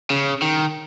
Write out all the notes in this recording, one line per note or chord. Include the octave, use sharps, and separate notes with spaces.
C#3
D#3